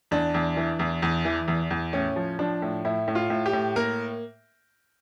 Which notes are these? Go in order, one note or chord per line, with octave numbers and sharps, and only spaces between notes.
E2 D4
E2
E3
E2
E2
E3
E2
E2
A2 C#4
F3
F3 D4
A2
A2 E4
A2
F4
A2
G4
A2
A#3 A#4